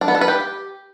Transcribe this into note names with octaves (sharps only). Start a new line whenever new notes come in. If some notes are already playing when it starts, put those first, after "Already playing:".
D4
B3
A4
B4
G4